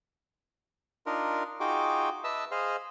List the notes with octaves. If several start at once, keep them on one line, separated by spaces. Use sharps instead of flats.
D4 D#4 F4 A#4
D#4 F4 F#4 G#4 G5 D6
B4 D#5 E5 A5 E6
G#4 C5 D#5 F5